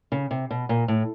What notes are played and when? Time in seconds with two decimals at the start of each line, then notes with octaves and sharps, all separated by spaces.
0.12 C#3
0.31 C3
0.51 B2
0.69 A#2
0.88 A2